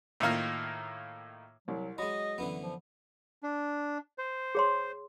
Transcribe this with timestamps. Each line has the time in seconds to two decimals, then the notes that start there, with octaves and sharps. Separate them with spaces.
0.20 A2 D#3 A#3 F4
1.68 C2 F#3
1.98 F#3 G#3 D#5 B5
2.38 F#2 D3 E3 B3
2.62 F3
3.43 D4
4.18 C5
4.55 G#4 C#5 C6